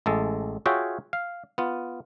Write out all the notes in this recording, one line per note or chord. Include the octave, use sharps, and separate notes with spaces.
A1 G#3 A4
F4 F#4 G#4 C#5 E5 G5
F5
B3 F4